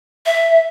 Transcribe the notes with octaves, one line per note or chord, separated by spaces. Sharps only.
E5